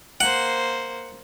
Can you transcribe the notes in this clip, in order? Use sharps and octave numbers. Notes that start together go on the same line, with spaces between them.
A#3 C5 F#5